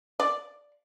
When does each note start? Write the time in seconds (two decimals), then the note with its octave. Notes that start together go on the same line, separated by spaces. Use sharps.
0.20 D5